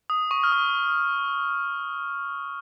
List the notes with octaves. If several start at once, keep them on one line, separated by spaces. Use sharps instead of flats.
D#6
C#6
F6
D#6